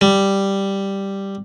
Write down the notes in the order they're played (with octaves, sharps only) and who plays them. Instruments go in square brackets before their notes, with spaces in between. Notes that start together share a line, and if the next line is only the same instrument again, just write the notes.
[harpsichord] G3